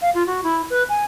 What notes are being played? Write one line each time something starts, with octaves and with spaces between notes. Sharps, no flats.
F5
F4
F#4
E4
B4
G#5